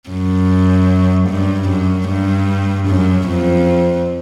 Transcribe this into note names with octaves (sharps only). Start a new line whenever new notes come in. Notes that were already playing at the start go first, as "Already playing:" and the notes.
F#2
G2
F#2
G2
F#2
F2